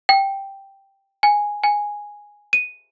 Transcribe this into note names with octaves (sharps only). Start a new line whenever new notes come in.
G5
G#5
G#5
D#7